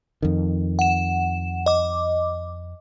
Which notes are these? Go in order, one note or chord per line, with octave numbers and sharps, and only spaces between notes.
F2 D#3
F#5 E7
D#5 D6